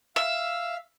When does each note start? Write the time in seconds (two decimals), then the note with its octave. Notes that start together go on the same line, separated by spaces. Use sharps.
0.16 E5 F5